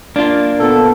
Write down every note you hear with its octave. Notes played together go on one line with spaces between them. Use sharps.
A#3 D4 F4
A#2 B3 A4